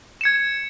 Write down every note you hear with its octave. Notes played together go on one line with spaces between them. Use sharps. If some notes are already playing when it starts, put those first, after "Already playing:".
G#6 C#7 E7